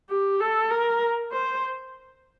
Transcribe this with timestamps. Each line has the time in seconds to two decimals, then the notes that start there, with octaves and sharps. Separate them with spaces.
0.10 G4
0.40 A4
0.71 A#4
1.32 C5